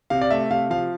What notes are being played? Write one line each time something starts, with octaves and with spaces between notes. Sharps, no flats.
C3 F5
D5
A3 E5
C3 F5
F3 F5